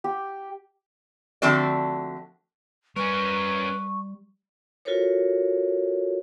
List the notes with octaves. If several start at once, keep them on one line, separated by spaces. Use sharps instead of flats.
G4
D3 F3 A3 C4 F#4 D5
G3 C#4 A#4 B4 C#6
F4 F#4 A4 A#4 C5 C#5